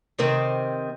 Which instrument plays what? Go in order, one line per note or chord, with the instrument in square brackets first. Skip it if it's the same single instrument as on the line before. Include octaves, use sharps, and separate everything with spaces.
[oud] C3 D#3 C4